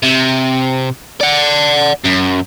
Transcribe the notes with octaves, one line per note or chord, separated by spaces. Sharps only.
C3
D5 F#5
F#2